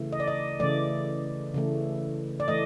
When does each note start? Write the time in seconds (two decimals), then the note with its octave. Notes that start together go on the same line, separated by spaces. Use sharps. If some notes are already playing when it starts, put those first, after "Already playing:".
Already playing: C#3 E3 A3
0.13 D#5
0.20 D5
0.28 D#5
0.60 C#3 E3 A3 D5
1.54 C#3 E3 A3
2.40 D5
2.48 E3 A3 D#5